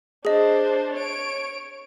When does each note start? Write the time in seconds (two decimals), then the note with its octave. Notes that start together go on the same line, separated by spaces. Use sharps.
0.25 D4 G#4 C5 D#5
0.93 C#5 D7